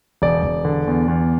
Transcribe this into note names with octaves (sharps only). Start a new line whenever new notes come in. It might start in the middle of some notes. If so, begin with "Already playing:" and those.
E1 D5
E1
D3
E2
E2